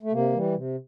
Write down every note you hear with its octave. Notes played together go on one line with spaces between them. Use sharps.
A3
C3 A#3
E3 G3
C3